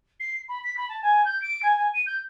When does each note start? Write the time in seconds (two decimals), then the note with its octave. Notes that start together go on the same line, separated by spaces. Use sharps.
0.20 C7
0.49 B5
0.64 B6
0.77 B5
0.89 A5
1.02 G#5
1.25 G6
1.42 D7
1.63 G#5
1.77 G#5
1.94 D#7
2.06 G6